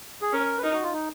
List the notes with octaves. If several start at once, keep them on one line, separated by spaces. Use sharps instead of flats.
G#4
C#4 A#4
B4
D#4 A#4
F#4
F4
D#4